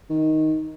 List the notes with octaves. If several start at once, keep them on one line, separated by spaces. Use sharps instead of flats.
D#3